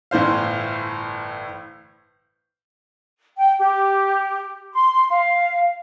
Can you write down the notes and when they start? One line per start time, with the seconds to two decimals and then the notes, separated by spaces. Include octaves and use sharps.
0.11 G1 A2 E3 C5 F5
3.37 G5
3.58 G4
4.74 C6
5.10 F5